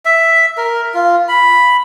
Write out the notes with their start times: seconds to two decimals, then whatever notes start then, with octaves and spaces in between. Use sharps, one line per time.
0.05 E5
0.57 A#4
0.94 F4
1.28 B5